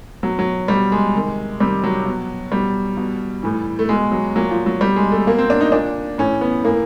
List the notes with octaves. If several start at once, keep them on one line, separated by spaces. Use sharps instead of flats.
B2 F#3
F#3
B2 G3
G#3
C3 D#3
C3 D#3 G3
F#3
B2
B2 G3
B2
A2 E3
A3
B2 G#3
F#3
A#2 F#3
F3
F#3
B2 G3
G#3
A3
B2 A#3
C4
D4
D#4
A#2 D4
A2 E3 C#4
B3
A2 E3 A#3